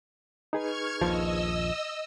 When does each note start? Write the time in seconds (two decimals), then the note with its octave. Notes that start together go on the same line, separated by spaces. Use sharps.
0.53 D#4 G#4 B4 C#6 F6 G#6
1.02 D#1 A#1 F3 D#5 E6